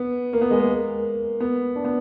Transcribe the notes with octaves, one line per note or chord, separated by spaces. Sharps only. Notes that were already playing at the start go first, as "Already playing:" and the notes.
Already playing: B3
A#3
B3
G#3
A#3
B3
D4
B3